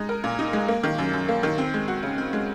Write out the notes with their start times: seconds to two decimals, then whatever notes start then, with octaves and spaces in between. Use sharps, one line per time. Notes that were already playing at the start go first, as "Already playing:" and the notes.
Already playing: G#3 D#4
0.09 A#4
0.24 A#2
0.39 D#4
0.53 G#3
0.68 A#3
0.83 D#3
0.98 F#2
1.13 F#2
1.28 A#3
1.43 D#3
1.58 C4
1.74 G#3
1.88 F#4
2.03 C#3
2.18 C4
2.33 G#3